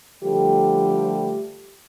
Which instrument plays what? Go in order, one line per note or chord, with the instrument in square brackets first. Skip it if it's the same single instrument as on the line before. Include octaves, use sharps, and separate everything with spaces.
[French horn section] D3 F3 G3 A3 G4